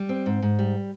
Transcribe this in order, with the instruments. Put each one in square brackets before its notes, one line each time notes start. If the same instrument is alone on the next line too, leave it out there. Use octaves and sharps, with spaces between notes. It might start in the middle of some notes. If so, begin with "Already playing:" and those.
Already playing: [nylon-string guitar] G3
C4
G#2
G#2
G3